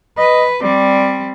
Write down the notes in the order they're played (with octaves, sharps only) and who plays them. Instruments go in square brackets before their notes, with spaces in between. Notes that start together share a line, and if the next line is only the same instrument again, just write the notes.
[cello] B4 [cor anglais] D#5
[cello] G3 C4 [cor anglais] D5